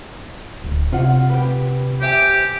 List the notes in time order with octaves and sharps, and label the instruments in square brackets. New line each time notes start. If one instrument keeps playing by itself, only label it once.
[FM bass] D1
[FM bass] C3 [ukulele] F4 F#5
[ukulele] G4 B4
[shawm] G4 [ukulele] C5 E5 G#5